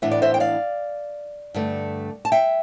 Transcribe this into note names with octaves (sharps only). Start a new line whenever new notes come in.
A2 E3 B3 D4 E5
D5
C5 E5
G5
D5 F5
G2 D3 A3
A5
E5 G5